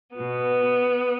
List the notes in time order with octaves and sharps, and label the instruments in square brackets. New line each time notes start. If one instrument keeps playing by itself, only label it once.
[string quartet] B2 B3